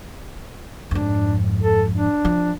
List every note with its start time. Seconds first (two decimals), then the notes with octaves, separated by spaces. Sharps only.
0.91 F2 G#2 D4
1.63 A4
1.94 D4
2.25 F3